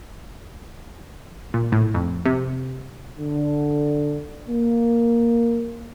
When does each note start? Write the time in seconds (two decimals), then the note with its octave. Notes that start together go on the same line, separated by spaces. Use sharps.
1.54 A#2
1.72 A2
1.94 F2
2.25 C3
3.19 D3
4.48 A#3